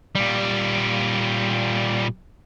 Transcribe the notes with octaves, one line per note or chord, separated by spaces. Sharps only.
A#2 G3